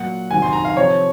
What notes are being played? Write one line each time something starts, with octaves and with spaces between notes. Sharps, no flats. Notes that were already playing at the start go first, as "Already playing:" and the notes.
Already playing: A#2 F#3 F#5
C3 D#3 F#3 G#5
C6
A#5
F5
C3 F3 C#5